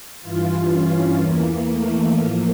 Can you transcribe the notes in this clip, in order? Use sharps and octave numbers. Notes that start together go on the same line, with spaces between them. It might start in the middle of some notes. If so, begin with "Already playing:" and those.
G2 E3 F4
C#4
E2 E3 A#3
A3
A2 F3 A#3